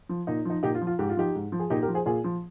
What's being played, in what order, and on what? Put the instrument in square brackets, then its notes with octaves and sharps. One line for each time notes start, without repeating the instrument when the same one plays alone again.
[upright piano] F3
A#2 D#4
F3 D#4
A#2 D#4 G4
F4
F3
F4
G#2 G4
F4
F3 D#4 G4
G#2
F3
G#4
A#2 D#4 G4
G4 A#4
F3
G#4 C5
A#2 F4 G#4
F3